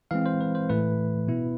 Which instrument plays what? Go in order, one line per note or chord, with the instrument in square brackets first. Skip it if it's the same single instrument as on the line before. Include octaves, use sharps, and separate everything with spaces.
[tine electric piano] E3 G#3 C4 F5
C5
B4
C5
A2 E3 A3 E4 B4
B2 B3 E4